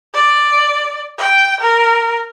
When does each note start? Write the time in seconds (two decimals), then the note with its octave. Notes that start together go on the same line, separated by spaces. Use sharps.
0.14 D5
1.18 G5
1.60 A#4